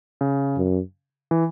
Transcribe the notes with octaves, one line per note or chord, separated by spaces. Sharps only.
C#3
F#2
E3